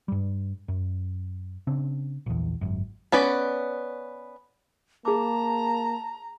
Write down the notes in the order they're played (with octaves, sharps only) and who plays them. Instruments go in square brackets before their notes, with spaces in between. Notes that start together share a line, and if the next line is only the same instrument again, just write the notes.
[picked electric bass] G2 G3
F#2
C#3 C4 D4
A#1 E2
G#1 F#2
[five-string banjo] B3 C#4 B4 D5
[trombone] A#3 [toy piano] G#4 D6 [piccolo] A5 [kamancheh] A#5